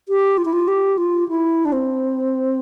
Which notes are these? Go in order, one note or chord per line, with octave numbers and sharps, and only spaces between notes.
G4
F4
E4
F4
G4
F4
E4
D4
C4